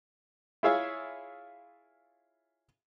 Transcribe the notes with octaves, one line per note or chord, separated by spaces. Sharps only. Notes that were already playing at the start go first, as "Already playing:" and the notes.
E4 F4 G#4 C#5 E5 F5